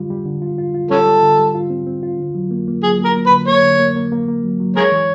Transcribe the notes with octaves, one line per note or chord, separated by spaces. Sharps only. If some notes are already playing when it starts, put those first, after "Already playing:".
Already playing: D3 G3 F4
G3
D3
F4
F4
F4
G3 C#4 A4
G3
D3
G3
F4
C4
C4
F4
D3
F#3
A#3
A#3
F#3 G#4
A#3
A#4
A#3
B4
D3
A#3 C#5
D3
A#3
A#3
A#3
A#3
F#3
F#3
G#3 G#4 A#4 C#5
E3